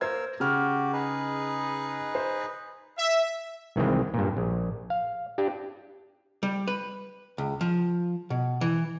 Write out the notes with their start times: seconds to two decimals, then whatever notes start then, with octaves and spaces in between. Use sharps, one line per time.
0.01 A#3 A#4 C5 E6 G#6
0.40 C#3 F#4 G4 F6
0.93 D#4 G#4 B4
2.15 C5
2.98 E5
3.76 C2 D#3 E3 G#3 C4
4.14 G2 A#2
4.37 A#1
4.90 F5
5.38 D4 G4
6.43 G3
6.68 B4
7.38 C#2
7.61 F3
8.30 B2
8.61 E3